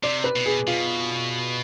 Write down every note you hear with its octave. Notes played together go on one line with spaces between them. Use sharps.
C3 D5
B4
B2
G#4
B2 F4